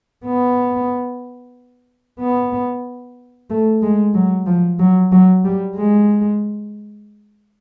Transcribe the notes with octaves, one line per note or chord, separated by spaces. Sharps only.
B3
B3
A3
G#3
F#3
F3
F#3
F#3
G3
G#3